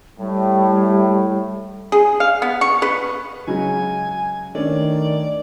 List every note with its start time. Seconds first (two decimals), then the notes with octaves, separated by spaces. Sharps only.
0.19 A2 G3
1.92 G#4
2.20 F5
2.42 B3
2.61 C#6
2.82 B4
3.47 C#3 F#3 G#3 G#5
4.55 D#3 A3 C#4 D4 D5